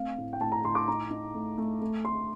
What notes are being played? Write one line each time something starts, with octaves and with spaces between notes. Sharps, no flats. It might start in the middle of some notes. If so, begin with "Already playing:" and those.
Already playing: A3 C4 F5
A2
G5
A2 A5
A#5
A2 C6
D6
D#4 A#5
D#4
A3
A3
A3
A3 C6